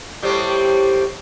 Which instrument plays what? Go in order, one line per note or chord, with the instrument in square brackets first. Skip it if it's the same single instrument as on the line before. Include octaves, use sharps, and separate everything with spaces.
[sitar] A2 G3 C4